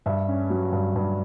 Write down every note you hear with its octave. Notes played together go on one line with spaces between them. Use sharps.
G2 E5
C#4
F#3
G2
G2